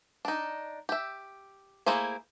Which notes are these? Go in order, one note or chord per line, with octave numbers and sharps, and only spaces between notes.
D4 D#4
G4 E5
A3 A#3 E4 G#4 C5